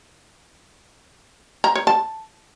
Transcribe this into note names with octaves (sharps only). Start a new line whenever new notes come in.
A#5
C#5
A5